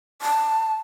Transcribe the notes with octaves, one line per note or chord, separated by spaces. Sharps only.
A5